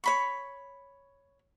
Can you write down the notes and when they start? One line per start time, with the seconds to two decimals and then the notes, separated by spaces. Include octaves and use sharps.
0.04 C#5 B5 C#6